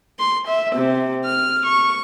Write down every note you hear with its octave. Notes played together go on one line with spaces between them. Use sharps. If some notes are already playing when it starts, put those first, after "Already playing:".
C6
E5
C3
F6
C#6